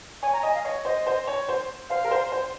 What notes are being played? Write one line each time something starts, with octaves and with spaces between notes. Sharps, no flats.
C#5 G#5
A#5
D#5 G#5
F5
C#5 D#5
C5 D#5
C5
C#5
C5
C5 F5
A#4
C5
C5